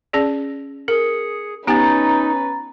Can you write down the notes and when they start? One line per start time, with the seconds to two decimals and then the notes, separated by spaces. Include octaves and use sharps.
0.13 C#4 G#4 D5
0.88 G#4 A#4 C#7
1.67 B3 C#4 D#4 G4 B4 G#5 A#5 A6